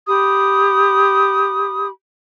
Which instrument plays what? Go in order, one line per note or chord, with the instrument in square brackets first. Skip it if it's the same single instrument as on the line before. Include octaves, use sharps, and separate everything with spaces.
[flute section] G4 B5 D#6